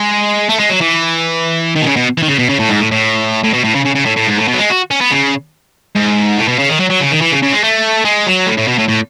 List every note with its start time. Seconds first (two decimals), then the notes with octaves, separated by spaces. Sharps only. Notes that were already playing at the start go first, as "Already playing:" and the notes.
Already playing: G#3
0.50 A3
0.60 G#3
0.70 F#3
0.81 E3
1.76 D#3
1.82 B2
1.86 C#3
1.96 B2
2.18 E3
2.23 D#3
2.28 C#3
2.39 B2
2.49 C#3
2.59 A2
2.69 G#2
2.81 A2
2.91 A2
3.44 A2
3.54 B2
3.64 A2
3.75 C#3
3.85 C#3
3.96 C#3
4.06 A2
4.17 A2
4.28 G#2
4.38 A2
4.48 B2
4.54 F#3
4.59 G#3
4.70 F#4
4.91 C#4
5.01 B3
5.11 C#3
5.95 G#2
6.37 A2
6.48 B2
6.59 C#3
6.68 D#3
6.80 F#3
6.90 F#3
7.00 C#3
7.11 D#3
7.21 E3
7.32 C#3
7.42 C#3
7.53 G#3
7.63 A3
8.05 G#3
8.27 F#3
8.47 A2
8.58 A2
8.68 B2
8.78 A2
8.89 A2